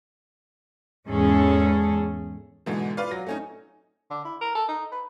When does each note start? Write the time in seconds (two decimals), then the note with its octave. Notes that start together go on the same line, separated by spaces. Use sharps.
1.08 E2 G#2 C#4 G#4 A4
2.66 G#2 B2 D3 E3
2.97 F4 B4 D5 F5
3.11 F#3 A#6
3.27 A3 C#4 D#4
4.11 D3
4.25 E4
4.41 A#4
4.55 A4
4.68 D#4
4.92 B4